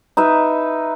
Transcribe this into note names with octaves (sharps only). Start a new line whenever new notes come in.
D#4 B4 E5